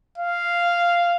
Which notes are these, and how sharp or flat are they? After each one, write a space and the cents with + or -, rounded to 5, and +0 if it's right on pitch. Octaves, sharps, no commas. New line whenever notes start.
F5 -5